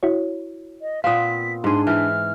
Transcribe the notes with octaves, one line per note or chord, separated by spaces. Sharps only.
E4 F#4 C#5
D#5
A#2 B3 C4 F5 D#6 B6
G#2 D4 G#4 C6
E3 E4 F6